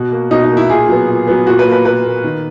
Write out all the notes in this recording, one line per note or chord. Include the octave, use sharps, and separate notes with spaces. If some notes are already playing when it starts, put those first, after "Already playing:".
Already playing: B2 F#4
A#3
B2 D#4
D#4
A#3
E4
A#2 G#4
F#3 B3
A#2
F#3 B3
A#2 F#4
B4
A#3
B4
A#2 B4
A#3
D#3